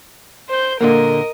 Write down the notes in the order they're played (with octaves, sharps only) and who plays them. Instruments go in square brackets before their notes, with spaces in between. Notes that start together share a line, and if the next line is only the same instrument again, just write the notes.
[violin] C5 G6
[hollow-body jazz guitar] A#2 D3 A#3 [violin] A#4 D#5